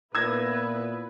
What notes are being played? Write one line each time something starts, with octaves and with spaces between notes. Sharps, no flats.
A#2 B3 E4 B4 E6 G#6 A#6